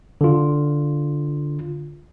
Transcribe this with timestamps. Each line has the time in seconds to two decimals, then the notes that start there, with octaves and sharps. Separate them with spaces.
0.21 D3 F4